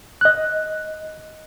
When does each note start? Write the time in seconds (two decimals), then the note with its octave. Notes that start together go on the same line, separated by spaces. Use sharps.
0.21 D#5 F#6